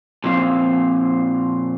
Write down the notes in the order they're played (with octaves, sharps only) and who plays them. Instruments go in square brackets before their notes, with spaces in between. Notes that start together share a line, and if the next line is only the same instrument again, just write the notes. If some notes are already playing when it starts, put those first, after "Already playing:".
[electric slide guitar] A#2 F3 C4 F5